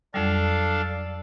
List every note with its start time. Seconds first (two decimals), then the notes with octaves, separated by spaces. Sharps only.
0.14 F2 F#3 G3 D4 A4 F5